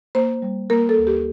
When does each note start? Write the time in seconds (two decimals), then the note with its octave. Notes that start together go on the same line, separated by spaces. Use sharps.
0.15 A#3 C5
0.42 G3
0.70 A#3 A#4
0.89 A4
0.98 D2
1.07 G4